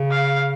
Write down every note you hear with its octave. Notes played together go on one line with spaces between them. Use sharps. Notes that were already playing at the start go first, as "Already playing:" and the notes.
Already playing: C#3
F5